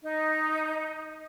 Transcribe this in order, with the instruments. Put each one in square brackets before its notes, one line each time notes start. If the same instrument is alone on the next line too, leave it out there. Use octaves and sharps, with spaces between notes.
[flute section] D#4